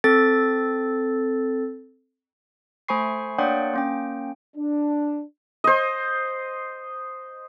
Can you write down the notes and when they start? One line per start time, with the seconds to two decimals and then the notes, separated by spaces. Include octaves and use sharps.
0.04 C4 A4 A6
2.88 A3 C5 G#5 B5 C#6 C7
3.38 A#3 D4 C#5 D5 F#5 G5
3.74 A#3 C#4 G5
4.56 D4
5.64 C5 D#5